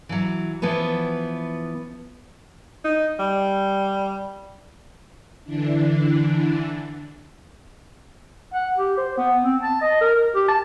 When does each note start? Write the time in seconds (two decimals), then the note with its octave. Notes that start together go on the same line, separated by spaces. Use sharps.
0.09 E3 F#3
0.62 E3 F3 B3 B4
2.84 D#4
3.20 G3
5.45 D3 E3 D4
8.54 F#5
8.77 G4
8.97 C5
9.17 B3
9.44 C4
9.62 A5
9.81 D#5
10.01 A#4
10.35 G4
10.48 A5